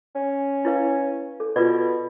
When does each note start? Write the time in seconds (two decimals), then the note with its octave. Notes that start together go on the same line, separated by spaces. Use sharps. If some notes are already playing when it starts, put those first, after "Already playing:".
0.15 C#4
0.65 E4 B4 F5
1.40 A4
1.56 B2 F4 B4 D5